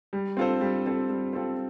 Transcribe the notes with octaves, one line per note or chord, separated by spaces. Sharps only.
G3
C4 F4 A4 C5
G3
C4 F4 A4 C5
G3
C4 F4 A4 C5